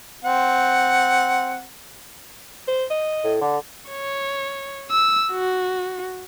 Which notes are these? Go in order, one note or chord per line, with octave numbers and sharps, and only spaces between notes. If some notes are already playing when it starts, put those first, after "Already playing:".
C4 F#5
C5
D#5
A2
D3
C#5
E6
F#4